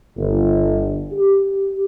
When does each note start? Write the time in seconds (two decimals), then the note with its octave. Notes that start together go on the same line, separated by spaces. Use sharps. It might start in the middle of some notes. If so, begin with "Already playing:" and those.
0.17 G1
1.13 G4